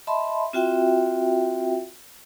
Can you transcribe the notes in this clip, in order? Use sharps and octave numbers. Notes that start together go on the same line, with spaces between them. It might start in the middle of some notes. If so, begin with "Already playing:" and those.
D#5 E5 A5 B5 C6
C4 F4 F#4 E5 G5